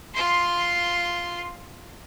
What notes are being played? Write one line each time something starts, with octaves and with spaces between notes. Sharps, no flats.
F4 C6